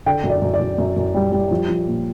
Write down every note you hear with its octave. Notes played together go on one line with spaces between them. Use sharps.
D3 G5
F#2
D5
F#2
D5
F#2
F#2
F#2
G3
G3
F3
F3
A#2